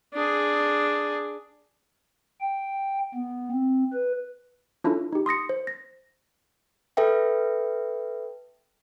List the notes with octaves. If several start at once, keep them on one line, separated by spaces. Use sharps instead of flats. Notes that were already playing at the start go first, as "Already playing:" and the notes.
D4 G#4
G5
B3
C4
B4
C#4 D4 E4 F4 A4
D#4 G4
C6 D#6 A#6 C#7
C5
A#6
A4 B4 E5 G5